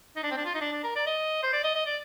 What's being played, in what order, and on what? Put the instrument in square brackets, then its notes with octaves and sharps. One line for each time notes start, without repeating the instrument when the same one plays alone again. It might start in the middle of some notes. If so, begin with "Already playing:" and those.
[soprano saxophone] D#4
D4
C4
D4
F4
D#4
D4
D4
A#4
D5
D#5
C5
D5
D#5
D#5
D5